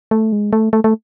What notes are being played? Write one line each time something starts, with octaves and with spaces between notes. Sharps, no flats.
A3
G#3
A3
A3
A3